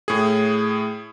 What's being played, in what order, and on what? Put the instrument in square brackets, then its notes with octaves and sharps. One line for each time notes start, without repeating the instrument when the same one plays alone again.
[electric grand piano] A2 G#4